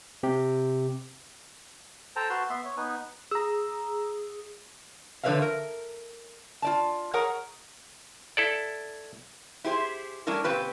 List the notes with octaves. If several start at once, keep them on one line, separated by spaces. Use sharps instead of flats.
C3 G4
A4 C5 G5 A5 A#5
F#4 B4 A5 C6
B3 E5 C6
C#5
B3 D#4 B4 G#5
G#4 A#5 E6
D3 F3 B4 C#5 E5 F5
A#4
F4 D5 A5
G#4 A#4 C#5 F#5 A#5
E4 A4 D5
E4 G4 G#4 C5
G3 A3 C#4 D4 E4 A#4
A#2 C#3 C4 G4 B4